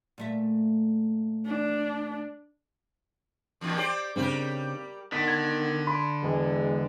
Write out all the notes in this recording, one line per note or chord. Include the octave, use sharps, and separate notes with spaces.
A#2 A3 E5
D4
E2 G2 A#2
G4 C5 D5
C#3 G3 C4 D4 G4 A#4
D3 D#3 B3 B6
G#6
B5 C6
E1 G#3